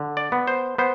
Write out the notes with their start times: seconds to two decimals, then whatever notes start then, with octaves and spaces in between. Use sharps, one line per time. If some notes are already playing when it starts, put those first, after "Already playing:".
Already playing: D3
0.17 D5
0.32 B3
0.47 C5
0.78 B3 C5